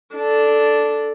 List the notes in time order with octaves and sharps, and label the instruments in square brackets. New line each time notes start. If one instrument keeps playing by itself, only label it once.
[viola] D4 A4